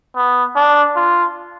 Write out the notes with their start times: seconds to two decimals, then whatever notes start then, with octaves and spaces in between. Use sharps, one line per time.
0.16 B3
0.56 D4
0.96 F4